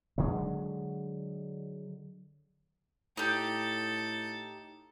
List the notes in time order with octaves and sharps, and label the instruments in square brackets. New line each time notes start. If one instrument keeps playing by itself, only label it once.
[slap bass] D3 F#3 G#3
[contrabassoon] A2 [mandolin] D#4 G4 [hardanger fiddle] A4